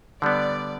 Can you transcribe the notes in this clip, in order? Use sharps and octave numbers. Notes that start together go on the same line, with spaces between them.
D3 G3 B3 D5